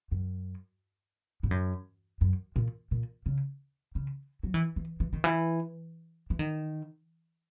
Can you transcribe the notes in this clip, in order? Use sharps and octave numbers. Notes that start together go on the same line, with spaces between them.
F#2
G#2
F#2
F#2
A#2
A#2
C#3
C#3
F#3
E3
E3
E3
D#3
E3
E3
D#3